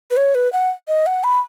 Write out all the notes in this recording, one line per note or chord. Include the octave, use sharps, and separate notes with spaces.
B4
C#5
B4
F#5
D#5
F#5
B5